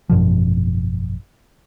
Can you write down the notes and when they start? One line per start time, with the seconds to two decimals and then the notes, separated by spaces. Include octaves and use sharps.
0.10 G#1 F#2 B2 F3